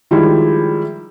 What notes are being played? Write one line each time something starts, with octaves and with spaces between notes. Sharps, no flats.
D#3 F3 G3 G#3 E4